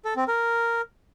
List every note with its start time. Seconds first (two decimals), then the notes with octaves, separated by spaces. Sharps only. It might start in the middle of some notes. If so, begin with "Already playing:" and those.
0.05 A4
0.16 C4
0.28 A#4